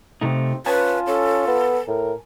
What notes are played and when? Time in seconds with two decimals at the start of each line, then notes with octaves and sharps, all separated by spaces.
0.21 C3 A3 C4 D#4
0.66 C#4 F4 B4 G#5 A5
1.07 C#4 A4
1.47 B3
1.88 A2 A#4